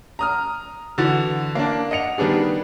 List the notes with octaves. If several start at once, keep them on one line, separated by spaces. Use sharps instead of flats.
A#5 D#6 F6
D3 E3 F#4 A6
A#3 D4
D#5 F#5 C#7 F7
D#3 G3 B3 D4 G#4